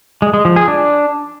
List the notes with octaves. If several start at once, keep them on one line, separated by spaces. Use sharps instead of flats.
G#3
G#3
F3
G#4
D4